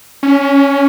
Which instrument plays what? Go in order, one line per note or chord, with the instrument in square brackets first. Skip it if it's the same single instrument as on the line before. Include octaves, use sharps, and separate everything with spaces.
[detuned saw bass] C#4